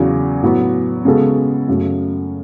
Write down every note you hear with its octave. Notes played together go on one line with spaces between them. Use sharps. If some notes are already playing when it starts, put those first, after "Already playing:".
Already playing: E2 C#3 F#3
A2 F#3 B3
C#3 G#3 B3 F#4 A4
F#2 C#3 F#3 A3